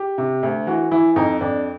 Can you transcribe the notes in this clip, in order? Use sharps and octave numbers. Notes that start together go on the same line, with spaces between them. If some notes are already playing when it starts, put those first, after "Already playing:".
Already playing: G4
C3
D2
E3 F#4
E3 E4
F2 D#4
F2 D4